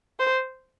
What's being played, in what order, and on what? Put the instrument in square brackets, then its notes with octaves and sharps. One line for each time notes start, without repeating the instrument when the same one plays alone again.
[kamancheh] C5